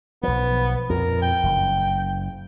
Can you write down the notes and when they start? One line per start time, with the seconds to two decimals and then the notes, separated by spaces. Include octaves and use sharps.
0.23 B1 F3 B3
0.90 F2 A#2 F3 A#4
1.22 G5
1.43 F#1